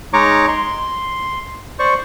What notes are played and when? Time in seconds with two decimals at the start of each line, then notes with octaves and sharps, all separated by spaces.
0.13 G#3 D#4 C#5 A#5 C#6 D6
0.48 C6
1.79 C5 D5 C#6